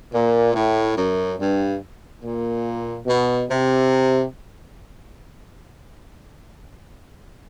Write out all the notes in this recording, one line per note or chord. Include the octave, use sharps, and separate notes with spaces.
A#2
A2
F#2
G2
A#2
B2
C3